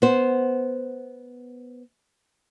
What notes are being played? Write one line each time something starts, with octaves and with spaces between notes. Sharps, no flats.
B3 C5